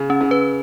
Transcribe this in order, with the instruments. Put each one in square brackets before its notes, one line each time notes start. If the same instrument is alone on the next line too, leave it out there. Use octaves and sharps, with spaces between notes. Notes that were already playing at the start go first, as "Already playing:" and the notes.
Already playing: [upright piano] C#3
[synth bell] C#4
[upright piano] C#3
[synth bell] B4